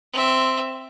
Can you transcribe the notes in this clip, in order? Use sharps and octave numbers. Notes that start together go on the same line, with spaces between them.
C4 E5